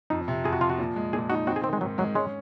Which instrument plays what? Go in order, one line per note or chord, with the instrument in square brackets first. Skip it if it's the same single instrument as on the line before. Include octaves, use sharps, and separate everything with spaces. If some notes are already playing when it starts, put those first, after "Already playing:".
[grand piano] F2 [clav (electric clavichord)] D#4
[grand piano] C3
[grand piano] F2 [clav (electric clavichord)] G#4
[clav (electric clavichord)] F#4
[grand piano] F3 [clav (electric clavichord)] F4
[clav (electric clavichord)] F#4
[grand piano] A#2
G#3
[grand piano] A#2 [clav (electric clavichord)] G#4
[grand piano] D#4 [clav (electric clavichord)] F#4
[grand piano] C4 [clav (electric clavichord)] F#4
[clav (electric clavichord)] G#4
[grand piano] D#3 [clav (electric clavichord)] C4
[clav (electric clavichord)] G#3
[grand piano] G#2 [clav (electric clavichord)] F#3
[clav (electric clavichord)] F#3 [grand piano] G#3
[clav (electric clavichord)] G#3 [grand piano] C#4